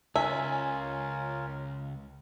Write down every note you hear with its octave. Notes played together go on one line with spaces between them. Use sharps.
C#2 C#4 F4 A#4 E5 G#5